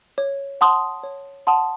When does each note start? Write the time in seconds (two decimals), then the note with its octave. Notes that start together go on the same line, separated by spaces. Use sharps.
0.18 C#5
0.61 F#5 A5 C6 D#6
1.03 C#5
1.47 F#5 A5 C6 D#6